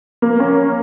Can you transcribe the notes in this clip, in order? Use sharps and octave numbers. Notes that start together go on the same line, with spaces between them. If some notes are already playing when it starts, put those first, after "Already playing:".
A#3
C#4